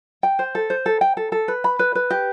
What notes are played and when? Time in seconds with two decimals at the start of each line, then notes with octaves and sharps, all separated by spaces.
0.23 G5
0.39 C5
0.55 A4
0.70 C5
0.86 A4
1.01 G5
1.17 A4
1.32 A4
1.48 B4
1.64 B5
1.79 B4
1.95 B4
2.11 G4